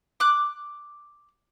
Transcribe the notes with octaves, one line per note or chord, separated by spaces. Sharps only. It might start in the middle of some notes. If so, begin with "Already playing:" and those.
D6 F#6